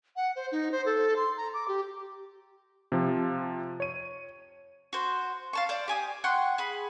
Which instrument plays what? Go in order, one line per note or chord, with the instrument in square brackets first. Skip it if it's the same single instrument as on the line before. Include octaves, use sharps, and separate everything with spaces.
[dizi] F#5
C5
D#4
C5
A4
C6
A#5
D6
G4
[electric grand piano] C3 F3
C#5 D#7
[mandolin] F#4 C5
F5 A5 C#6
C5 D5
G4 G#5 D#6
F#5 G5 C6 C#6
G#4 B5